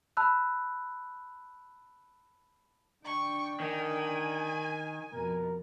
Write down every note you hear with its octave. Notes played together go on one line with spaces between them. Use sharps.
A5 B5 E6 F#6
D3 D4 G5 C#6
D#3 G#5
F2 B2 A#4